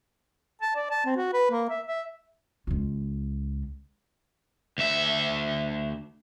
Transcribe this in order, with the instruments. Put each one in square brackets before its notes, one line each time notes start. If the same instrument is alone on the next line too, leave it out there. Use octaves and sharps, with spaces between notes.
[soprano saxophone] A5
D5
A5
C4
F#4
B4
A#3
E5
E5
[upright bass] C#2 F4
[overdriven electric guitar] D2 E5